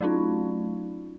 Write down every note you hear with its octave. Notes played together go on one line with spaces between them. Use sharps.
F#3 A3 C#4 D#4 F4